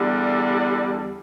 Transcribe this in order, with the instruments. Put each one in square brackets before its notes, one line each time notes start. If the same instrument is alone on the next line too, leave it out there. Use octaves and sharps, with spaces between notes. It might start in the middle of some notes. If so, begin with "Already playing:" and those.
Already playing: [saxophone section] E2 D3 G3